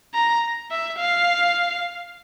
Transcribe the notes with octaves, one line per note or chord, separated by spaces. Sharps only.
A#5
E5
F5